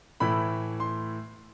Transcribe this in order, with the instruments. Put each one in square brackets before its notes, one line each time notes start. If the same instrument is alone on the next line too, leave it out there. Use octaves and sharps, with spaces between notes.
[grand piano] A2 E3 A3 E4 B5
C6